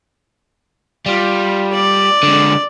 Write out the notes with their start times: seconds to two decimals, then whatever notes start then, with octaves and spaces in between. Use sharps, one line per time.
1.06 G3 F4
1.72 D5
2.23 D3 G#3